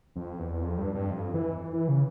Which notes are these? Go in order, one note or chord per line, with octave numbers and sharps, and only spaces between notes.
F2
E2
F2
G2
G2
F2
E3
E3
C#3